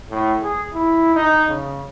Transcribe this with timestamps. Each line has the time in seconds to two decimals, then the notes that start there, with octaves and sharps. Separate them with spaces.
0.10 A2
0.43 G#4
0.74 E4
1.16 D#4
1.49 C#3